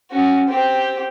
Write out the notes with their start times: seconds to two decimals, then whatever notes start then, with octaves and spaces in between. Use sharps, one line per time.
0.11 C#4 F#4
0.48 C4 G4